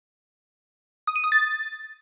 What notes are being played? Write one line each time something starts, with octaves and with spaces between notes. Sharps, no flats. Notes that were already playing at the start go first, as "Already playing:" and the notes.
D#6
D#7
D#6
A6